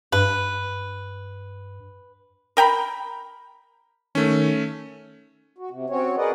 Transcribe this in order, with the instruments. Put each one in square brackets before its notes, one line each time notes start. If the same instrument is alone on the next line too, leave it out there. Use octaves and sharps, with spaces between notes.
[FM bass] G2 [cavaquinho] B4
[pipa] A#4 G5 A#5 B5
[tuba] D#3 [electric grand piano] A3 C#4
[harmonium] F#4
C3
C4 C#4 F#4 C#5
G#4 A#4 B4 D5 D#5 F#5